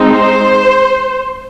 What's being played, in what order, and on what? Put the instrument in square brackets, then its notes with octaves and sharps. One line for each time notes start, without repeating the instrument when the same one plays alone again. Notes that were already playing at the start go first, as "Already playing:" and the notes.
Already playing: [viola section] G#3 C4 D#4
C5